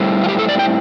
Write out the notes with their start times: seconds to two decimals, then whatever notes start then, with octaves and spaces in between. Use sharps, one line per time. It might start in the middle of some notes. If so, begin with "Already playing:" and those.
Already playing: A2 G3 C4
0.24 F4
0.29 G4
0.39 A4
0.49 D5
0.59 G5